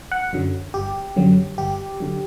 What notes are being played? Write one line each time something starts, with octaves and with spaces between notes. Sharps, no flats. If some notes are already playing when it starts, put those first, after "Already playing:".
F#5
F#2 D3 F#3
G1 G4
F#2 D3 F#3
G1 G4
D3 F#3